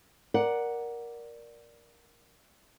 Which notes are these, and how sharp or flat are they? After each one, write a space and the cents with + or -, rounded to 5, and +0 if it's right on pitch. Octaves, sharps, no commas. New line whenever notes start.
A#4 +10 D5 +0 F#5 +0